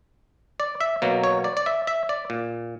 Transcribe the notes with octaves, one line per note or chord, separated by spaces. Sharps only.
D5
E5
B2 F#3 A#3
C#5
D5
D5
E5
E5
D5
A#2